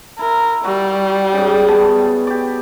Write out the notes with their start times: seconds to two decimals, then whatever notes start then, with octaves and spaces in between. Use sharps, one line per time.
0.19 E4 A#4
0.65 G3 F#4
1.33 G#2 C#3
1.68 B3 G#4 A5
2.27 G4 D5